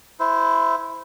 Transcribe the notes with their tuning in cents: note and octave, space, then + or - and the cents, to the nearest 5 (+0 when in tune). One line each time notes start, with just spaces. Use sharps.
E4 +0 C5 -20